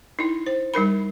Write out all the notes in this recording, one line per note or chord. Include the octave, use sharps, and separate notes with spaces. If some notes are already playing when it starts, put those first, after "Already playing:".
D#4 E4
C5
G3 D#4 A#4 B5